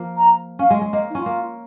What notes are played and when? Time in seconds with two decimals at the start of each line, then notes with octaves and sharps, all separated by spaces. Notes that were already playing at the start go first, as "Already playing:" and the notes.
Already playing: F3 A#3
0.17 A#5
0.59 C#4 F5
0.70 G#3
0.81 G#3
0.93 A#3 D#5
1.10 D#4
1.15 C#4 F4
1.26 A#3